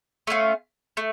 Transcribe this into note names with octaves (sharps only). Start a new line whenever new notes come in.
A3 C#4 F4
A3